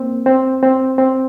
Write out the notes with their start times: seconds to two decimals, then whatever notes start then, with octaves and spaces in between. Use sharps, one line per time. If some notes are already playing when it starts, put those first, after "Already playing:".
Already playing: A#3 C4
0.26 C4
0.63 C4
0.98 C4